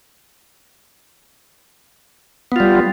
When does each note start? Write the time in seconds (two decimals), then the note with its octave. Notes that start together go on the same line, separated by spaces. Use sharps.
2.52 B3
2.56 F4
2.60 G3